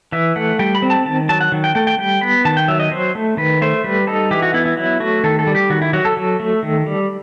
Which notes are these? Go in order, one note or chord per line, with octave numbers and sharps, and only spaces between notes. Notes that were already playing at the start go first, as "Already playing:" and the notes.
E3 E5
A3 F#5
G3 G5
B5
C4
A5
D#3 A5
F#3 A5
F#5
D#3
G5
A3 G5
G5
G3 G5
B3 B5
D#3 A5
G5
F#3 E5
D#5
F#3 C5
A3
D#3 B4
A3 C5
G3 B4
D#4 A4
E3 G4
F#4
B3 E4
E4
F#3 E4
A3 F#4
D#3 A4
A4
G3
G4
D#3 F#4
E4
F#3 F#4
A4
F#3
A3
D#3
G3